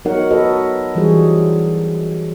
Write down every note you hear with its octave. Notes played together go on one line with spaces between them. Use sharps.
F#3 B3 D#4 A#4 C#5 F#5
F#4 A4 B4 D#5
E3 F#3 G3 F#4 G#4 C5